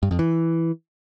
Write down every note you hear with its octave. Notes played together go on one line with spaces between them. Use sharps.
G2
F2
E3